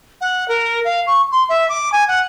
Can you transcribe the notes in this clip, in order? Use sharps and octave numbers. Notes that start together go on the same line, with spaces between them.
F#5
A#4
F5
C#6
C6
E5
D6
G#5
F#5